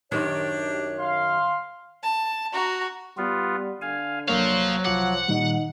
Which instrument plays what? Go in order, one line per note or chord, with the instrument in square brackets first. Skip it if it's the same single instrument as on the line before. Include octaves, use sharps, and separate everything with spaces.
[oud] F#2 D#3 C5 [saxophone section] D4 G4 [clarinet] C#5
[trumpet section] F5 C6
[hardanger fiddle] A5
F#4 A#5
[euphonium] G3 [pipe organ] B3 F4
[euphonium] D3 [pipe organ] F5 G#5
[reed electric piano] C2 A#3 C#5 [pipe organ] F#3 [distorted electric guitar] C5 F5
[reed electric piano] C2 D6 [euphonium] F3 [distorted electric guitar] F#5
[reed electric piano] A#2 D#3 G3 [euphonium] D#4